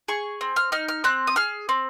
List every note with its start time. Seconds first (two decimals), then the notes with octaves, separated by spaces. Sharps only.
0.08 G#4 C#6
0.41 C4
0.56 F6
0.72 D#4 F6
0.88 F6
1.04 C4 F#6
1.27 D#6
1.36 G#4 F6
1.69 C4